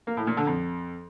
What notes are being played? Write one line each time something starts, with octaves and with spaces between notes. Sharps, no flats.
A#3
A2
A#2
D3
F2